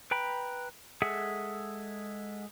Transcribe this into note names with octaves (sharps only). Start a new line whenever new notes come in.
B4 G5 A#5 B5
G#3 G#4 A4 E5 F#5